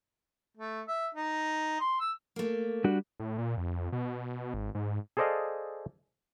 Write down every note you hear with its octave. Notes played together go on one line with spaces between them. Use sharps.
A3
E5
D#4
C6
E6
A3 A#3
G3 D4 F#4
A2
A#2
F2
B2
G#1
G#2
G#4 A4 C5 D5 D#5 F5